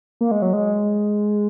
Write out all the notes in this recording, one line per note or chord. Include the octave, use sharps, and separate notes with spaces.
A#3
G#3
F#3
G#3